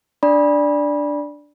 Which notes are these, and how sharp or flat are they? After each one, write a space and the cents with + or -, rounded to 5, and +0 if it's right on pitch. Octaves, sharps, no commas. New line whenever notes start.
D4 +0 D5 +0 B5 -25